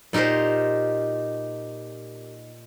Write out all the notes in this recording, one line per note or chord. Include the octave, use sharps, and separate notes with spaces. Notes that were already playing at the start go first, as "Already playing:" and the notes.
A#2 D#4 G4 A#4 C5